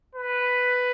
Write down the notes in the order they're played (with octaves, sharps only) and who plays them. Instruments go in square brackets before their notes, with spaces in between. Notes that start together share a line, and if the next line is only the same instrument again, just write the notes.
[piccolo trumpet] B4